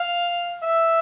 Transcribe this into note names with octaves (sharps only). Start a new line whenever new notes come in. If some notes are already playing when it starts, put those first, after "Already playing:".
Already playing: F5
E5